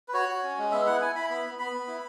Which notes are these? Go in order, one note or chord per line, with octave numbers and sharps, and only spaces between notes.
B4
F#4 C#5
F#4
C#4
G#3
B3 E5
E4 F#5
E4 G#5
E4 B5
B3 B5
B3
B3 B5
B3
E4